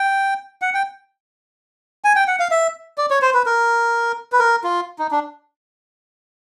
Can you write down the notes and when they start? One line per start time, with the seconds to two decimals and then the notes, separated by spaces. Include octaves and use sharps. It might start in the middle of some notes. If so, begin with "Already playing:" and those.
Already playing: G5
0.62 F#5
0.74 G5
2.04 G#5
2.16 G5
2.28 F#5
2.40 F5
2.51 E5
2.98 D5
3.11 C#5
3.22 C5
3.34 B4
3.46 A#4
4.32 B4
4.39 A#4
4.64 F4
4.99 D#4
5.11 D4